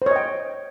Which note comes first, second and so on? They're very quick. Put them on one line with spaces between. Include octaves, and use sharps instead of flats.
C5 C#5 D#5 G5